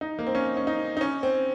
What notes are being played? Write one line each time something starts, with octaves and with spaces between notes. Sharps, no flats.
D#4
A#3
C4
C#4
C#4
D#4
D#4
C#4
C4